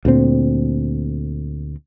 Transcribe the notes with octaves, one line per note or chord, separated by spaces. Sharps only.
D2 A#2 C4